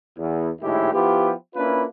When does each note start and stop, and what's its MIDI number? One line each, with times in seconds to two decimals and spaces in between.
0.18 0.49 40
0.62 0.91 34
0.62 0.91 45
0.62 0.91 51
0.62 0.91 56
0.62 0.91 64
0.62 0.91 67
0.93 1.33 53
0.93 1.33 59
0.93 1.33 64
0.93 1.33 65
0.93 1.33 67
1.55 1.84 58
1.55 1.84 61
1.55 1.84 62
1.55 1.84 64
1.55 1.84 65
1.55 1.84 71